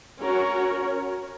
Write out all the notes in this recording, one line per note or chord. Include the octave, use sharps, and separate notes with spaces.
C#4 F#4 A#4 C#5